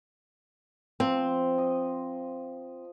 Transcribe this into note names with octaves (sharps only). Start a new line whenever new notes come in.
F3 C4
D#5